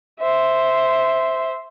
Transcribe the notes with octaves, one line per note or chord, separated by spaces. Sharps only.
C5 E5